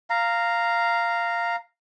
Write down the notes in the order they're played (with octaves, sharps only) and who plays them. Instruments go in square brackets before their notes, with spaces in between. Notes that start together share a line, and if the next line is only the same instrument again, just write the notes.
[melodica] F5 A#5